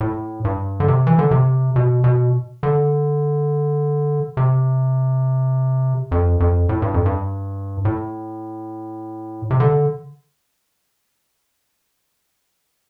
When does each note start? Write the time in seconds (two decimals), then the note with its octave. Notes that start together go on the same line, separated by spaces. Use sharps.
0.01 A2
0.45 G2
0.80 D3
0.88 C3
1.07 E3
1.19 D3
1.31 C3
1.76 B2
2.04 B2
2.63 D3
4.37 C3
6.11 F2
6.40 F2
6.69 A2
6.82 G2
6.94 F2
7.06 G2
7.85 A2
9.50 C3
9.60 D3